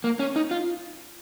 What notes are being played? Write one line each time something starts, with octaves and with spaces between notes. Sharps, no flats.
A#3
C#4
D#4
F4